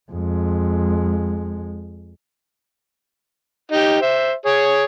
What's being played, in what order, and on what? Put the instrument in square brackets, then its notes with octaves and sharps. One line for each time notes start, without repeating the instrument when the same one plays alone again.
[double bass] F2 G#3
[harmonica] D#4 G4
C5 E5
G#4 C#5